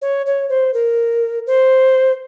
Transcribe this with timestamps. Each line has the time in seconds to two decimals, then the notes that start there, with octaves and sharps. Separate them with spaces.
0.02 C#5
0.26 C#5
0.49 C5
0.74 A#4
1.47 C5